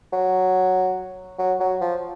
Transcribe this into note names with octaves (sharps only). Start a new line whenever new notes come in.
F#3
F#3
F#3
F3